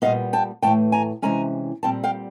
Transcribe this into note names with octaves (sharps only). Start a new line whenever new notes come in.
A#2 G3 B3 D#5 F5
G5 A5
A2 E3 A3 G5 A5
G#5 A#5
C3 E3 G#3 C#4 G#5 A#5
A#2 G3 C4 G5 A5
F5 G5